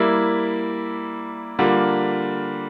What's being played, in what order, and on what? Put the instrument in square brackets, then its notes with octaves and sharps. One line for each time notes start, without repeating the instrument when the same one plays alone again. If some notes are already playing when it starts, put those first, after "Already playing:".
Already playing: [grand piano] G3 A#3 E4
D3 G3 A#3 F4